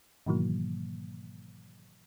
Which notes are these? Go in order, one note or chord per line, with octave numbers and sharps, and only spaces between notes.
G#2 B2 D#3 E3 F#3 A#3